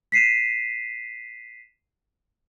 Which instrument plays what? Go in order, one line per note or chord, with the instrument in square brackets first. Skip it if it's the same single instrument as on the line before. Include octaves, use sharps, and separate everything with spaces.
[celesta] B6 C7 D#7 E7